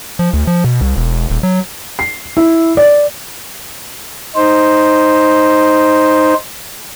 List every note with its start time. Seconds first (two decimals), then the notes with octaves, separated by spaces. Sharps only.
0.19 F3
0.33 D2
0.47 F3
0.64 B2
0.81 C2
0.97 E1
1.30 D#1
1.43 F#3
1.99 C7
2.37 E4
2.77 D5
4.36 D#4 C5